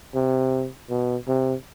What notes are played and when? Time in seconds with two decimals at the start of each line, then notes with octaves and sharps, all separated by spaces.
0.15 C3
0.90 B2
1.28 C3